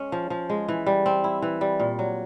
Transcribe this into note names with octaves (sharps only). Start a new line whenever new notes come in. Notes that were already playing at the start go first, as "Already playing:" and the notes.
Already playing: G#3 C#4
F3
F3
G#3
E3
G3
C4
E4
E3
G3
A#2
F#3